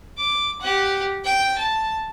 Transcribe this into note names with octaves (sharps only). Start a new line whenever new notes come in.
D6
G4 F#5
G5
A5